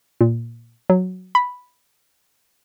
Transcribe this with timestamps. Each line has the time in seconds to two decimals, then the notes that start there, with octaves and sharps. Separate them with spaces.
0.21 A#2
0.90 F#3
1.35 B5